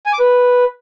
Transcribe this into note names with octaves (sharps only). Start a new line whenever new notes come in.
G#5
D6
B4